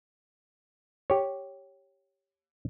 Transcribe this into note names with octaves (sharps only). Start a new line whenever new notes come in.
G4 C#5